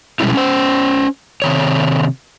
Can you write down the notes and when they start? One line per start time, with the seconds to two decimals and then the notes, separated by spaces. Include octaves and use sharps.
0.20 B2 G3 G#3 C#4 E4
0.35 C#4 C5
1.42 C3 D#3 C#5